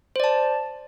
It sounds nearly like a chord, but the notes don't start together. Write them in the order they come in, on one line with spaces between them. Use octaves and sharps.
C5 D5 A5